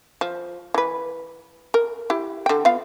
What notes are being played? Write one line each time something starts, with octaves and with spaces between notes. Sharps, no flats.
F3
E3 B4
A#4
E4 G4
D3 G5
B3 F4 F5